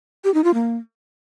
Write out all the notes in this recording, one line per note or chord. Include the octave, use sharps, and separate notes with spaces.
G4
D#4
F4
A#3